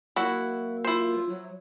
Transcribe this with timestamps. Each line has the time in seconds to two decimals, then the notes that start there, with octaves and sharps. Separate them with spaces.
0.16 F#3 A#3 E4 F#4
0.84 E4 F4 C5
1.29 F#3